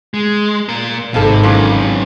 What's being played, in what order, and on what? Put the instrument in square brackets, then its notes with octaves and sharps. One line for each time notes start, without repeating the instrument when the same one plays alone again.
[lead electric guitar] G#3
A#2 A#4
[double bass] G#1 [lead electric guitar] C3 [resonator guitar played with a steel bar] A#3 A4
[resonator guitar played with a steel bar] A#2 E3 [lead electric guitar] C#3 F#3